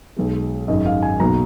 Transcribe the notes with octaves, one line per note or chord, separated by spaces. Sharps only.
B1 B2 G#3
G#1 F#2 D#3 G#3 D#5
F5
G#5
B1 B2 F#3 A#3 A#5